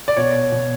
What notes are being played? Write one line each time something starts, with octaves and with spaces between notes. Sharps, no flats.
D5
B2 C#5
B2